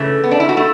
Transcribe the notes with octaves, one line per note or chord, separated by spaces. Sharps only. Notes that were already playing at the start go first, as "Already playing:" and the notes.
Already playing: C#3 E3 A3
B3
D4
E4
F#4
A3 E4